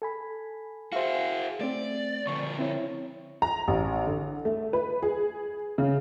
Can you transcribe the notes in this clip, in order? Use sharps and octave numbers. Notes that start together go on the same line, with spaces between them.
A4 G#5 B5
F#4 G#4 C5 E5 F5
A3 C4 D5
D3 F3 C#6
C4 E4 C#5
A#5
A1
D3
A3
B4
G#4
C#3